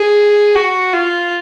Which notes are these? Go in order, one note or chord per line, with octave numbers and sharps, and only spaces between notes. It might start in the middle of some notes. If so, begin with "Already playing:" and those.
Already playing: G#4
F#4
F4